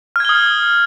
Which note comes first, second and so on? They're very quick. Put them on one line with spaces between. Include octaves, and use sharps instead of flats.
F6 G#6 G7 D#6